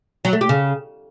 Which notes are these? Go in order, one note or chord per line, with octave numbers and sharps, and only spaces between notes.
F#3
A3
G4
C#3